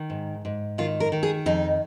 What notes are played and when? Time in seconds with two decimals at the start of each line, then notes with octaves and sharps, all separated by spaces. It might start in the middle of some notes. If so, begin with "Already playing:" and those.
Already playing: D#3
0.10 G#2
0.45 G#2
0.78 D#3 F4
1.00 A#4
1.12 D#3
1.23 G#4
1.46 F2 D#4